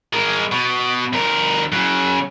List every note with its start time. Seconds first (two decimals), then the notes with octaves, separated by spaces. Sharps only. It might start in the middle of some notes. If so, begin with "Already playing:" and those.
0.13 G#3 A#4
0.52 B2
1.13 D2 A#4
1.72 C#3 F#3